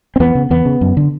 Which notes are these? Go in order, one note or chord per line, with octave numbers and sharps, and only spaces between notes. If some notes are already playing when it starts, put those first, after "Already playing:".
C4
E2 B3
C#3
E2 B3
C#3
F#2
D3